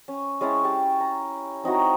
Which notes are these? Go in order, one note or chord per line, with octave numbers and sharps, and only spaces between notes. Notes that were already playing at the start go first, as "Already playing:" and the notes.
C#4
G#3 C#4 E4 A5
G4 A5
A#5
C4 D#4 E4 F#4